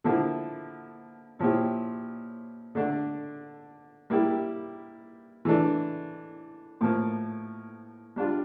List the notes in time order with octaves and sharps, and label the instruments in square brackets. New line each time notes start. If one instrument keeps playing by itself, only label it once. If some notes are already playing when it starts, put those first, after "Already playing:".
[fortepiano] D3 F3 A#3 E4
A#2 F3 C#4 E4 G4
D3 A3 D4
G3 A#3 E4 G4
E3 A3 D4
A2 F3 A#3
G3 D4 F4